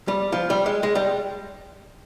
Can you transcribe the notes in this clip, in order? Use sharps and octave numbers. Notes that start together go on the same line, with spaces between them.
G3
F3
G3
G#3
G#3
G3